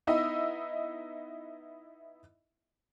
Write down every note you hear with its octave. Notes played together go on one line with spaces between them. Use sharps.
B3 D#4 E4 D#5 E5